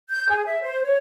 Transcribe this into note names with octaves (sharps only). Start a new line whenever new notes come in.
G6
G#4
E5
C5
C#5